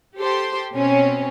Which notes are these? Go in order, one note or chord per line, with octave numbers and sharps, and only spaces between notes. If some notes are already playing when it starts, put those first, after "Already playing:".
G4 A4 C5 G5 C6
B2 C4 C#4